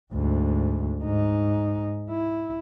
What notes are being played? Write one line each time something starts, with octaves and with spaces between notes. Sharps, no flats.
D2 G#2
G#2 D#4
E4